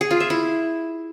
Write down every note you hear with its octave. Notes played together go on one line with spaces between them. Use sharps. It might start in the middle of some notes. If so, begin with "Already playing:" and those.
G#4
F4
E5
E4